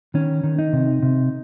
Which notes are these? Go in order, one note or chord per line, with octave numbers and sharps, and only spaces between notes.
D#3 C#4
D#3
D#4
C3
C3